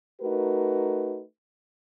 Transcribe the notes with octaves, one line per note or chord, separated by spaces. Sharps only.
A3 D#4 F#4 A#4 B4